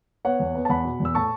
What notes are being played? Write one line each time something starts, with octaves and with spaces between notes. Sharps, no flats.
B3 C#5 F#5
E2
B3
A5
E2 F#5 B5
B2
E2
E6
A2 A5 C#6